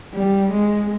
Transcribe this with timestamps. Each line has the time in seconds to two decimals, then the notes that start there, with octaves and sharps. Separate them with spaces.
0.14 G3
0.51 G#3